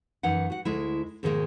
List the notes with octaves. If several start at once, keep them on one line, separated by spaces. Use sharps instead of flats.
F#2 E3 D#4 F#5
F#4 F#5
D2 G#3 E4
G#2 B2 D#3 F#3 G#3 A#3